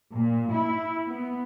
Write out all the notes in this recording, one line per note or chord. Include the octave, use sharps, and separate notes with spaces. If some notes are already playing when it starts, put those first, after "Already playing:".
A#2
E4
B3